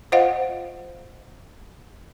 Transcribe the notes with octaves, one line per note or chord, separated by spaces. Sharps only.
F4 C5 D#5 F5 F#5